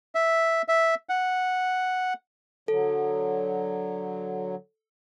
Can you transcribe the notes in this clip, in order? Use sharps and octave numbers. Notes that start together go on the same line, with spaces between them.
E5
E5
F#5
D3 F#3 A4